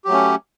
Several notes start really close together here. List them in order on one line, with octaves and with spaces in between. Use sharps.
G4 F#3 A3 C#4